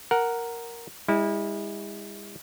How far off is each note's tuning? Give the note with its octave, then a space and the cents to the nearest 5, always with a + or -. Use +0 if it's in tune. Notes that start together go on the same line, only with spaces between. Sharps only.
A#4 +0 F#5 +0
G#3 -45 E4 -20